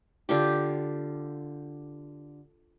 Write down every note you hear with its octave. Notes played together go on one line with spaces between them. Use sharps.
D3 F4 G4